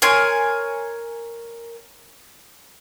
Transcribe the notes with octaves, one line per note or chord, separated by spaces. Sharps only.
A#4 C#5 G#5 C6